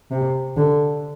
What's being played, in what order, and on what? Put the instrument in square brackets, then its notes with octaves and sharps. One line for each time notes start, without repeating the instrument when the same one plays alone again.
[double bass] C3
D3